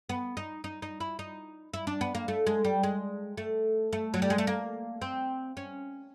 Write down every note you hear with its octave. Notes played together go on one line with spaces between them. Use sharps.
B3
D#4
D#4
D#4
E4
D#4
E4
D4
B3
A#3
A3
G#3
G3
G#3
A3
A3
F#3
G3
G#3
A3
A#3
C4
C#4